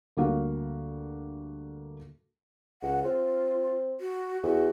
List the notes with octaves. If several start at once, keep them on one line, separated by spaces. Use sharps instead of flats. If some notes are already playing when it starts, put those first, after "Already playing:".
D2 G3 A#3 F#4 F5
C#2 F#5
C4 F4
F#4
E2 F#4